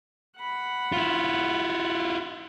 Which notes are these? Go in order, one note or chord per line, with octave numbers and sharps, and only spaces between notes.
F#5 B5
E4 F4